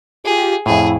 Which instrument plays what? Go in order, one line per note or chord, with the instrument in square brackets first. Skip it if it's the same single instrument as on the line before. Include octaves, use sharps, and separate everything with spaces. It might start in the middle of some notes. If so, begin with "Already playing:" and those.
[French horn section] F4 G4 [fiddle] G#4
[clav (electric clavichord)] F2 A2 [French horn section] E4 [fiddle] G#4